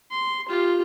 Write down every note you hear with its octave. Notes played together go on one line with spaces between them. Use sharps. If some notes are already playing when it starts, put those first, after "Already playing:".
C6
F4 G4